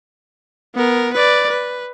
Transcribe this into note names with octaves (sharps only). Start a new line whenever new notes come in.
B3 A#4
B4 D5
B4